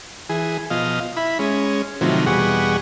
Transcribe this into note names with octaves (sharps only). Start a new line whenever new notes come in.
E3 G#4
B2 F3 D#5 F5
E4 B5
G#3 C#4
A2 C3 D#3 F3 F#3
E2 B2 G3 G#4 F#5 C#6